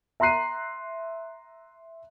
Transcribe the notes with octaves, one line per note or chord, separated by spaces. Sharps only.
E5 A#5 C6 F#6 C7 D#7